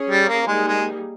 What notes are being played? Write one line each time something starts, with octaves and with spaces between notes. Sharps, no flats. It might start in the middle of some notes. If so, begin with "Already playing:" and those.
Already playing: C#4 G#4 C#5
G3
A#3
G3 G#3 A#3 D#4 G#4
G#3